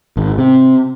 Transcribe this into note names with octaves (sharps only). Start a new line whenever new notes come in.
G#1
C3